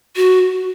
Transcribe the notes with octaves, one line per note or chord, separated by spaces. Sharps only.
F#4